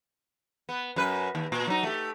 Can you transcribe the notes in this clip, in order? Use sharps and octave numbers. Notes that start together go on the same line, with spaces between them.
B3
F#2 B4
D#2
A#2
F#3 D#4
A3 G4